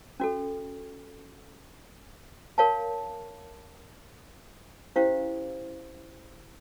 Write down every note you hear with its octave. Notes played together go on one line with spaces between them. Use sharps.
C#4 F#4 A4
A#4 C#5 F5 A5
C#4 E4 G4 C5 F5